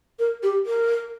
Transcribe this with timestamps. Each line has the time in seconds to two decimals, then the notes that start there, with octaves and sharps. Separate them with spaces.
0.19 A#4
0.43 G4
0.66 A#4